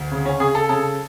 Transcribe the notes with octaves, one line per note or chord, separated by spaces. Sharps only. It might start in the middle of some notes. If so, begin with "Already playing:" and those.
Already playing: D2
C#3
C#4
C#3 G#4
A4
C#3 A4